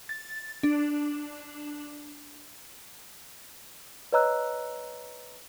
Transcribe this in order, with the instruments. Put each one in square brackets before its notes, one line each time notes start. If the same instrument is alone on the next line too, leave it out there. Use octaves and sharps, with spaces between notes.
[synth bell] A6
D4
[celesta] B4 C#5 D#5 A#5 E6 F#6